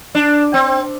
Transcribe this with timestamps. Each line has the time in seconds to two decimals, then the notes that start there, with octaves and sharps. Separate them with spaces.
0.15 D4
0.54 C4